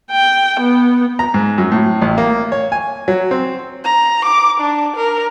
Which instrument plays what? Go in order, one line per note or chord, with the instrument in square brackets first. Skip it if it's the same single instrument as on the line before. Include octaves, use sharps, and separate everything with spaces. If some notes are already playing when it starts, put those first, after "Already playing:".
[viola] G5
B3
[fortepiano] A#5
G#2
F#2
A2
A1
A#3
C#5
G#5
F#3
C4
[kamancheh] A#5
D6
D4
A#4